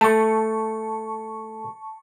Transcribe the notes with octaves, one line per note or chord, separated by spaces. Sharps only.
A3 A5 C#6